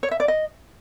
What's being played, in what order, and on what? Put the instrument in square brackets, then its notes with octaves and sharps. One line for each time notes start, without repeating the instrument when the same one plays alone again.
[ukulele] C#5
E5
D5
D#5